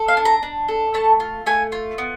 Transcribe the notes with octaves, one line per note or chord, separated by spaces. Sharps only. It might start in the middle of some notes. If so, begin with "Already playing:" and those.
Already playing: A4
F5
D4
A#5
D4
A4
A3 A5
F4
A3 G#5
F4
B3